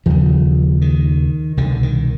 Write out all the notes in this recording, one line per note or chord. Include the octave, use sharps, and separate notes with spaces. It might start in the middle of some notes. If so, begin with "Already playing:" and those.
D#2 C#3 F3
D#3
C2 B2 D3
D#3